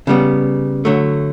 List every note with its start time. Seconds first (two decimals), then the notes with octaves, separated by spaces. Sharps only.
0.07 C#3 G3 B3
0.85 D3 F#3 A3